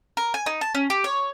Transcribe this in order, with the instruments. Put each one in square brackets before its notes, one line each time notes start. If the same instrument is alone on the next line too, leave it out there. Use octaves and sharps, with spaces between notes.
[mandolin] A#4
G#5
D#4
A5
C#4
G4
C#5